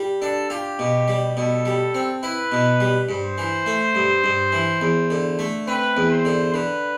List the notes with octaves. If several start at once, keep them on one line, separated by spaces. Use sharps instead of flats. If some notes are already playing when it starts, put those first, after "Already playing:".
Already playing: G3
D4 A4
F4 G4
B2
G3
B2 A4
G3
C4
E4 B4
B2
G3
G2 C5
E3
A3
G2
G2
E3
E2
D3
A3
C4 B4
E2
C5
D3
D3 B4